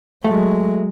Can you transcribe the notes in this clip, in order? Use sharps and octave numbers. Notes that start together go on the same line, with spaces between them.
F#3 G#3 A3